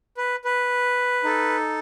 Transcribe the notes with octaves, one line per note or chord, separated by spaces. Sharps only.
B4
B4
D#4 A4